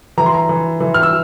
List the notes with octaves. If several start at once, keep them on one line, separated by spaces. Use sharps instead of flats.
E3 A#5
C6
A#5
E3
E3
F6
E6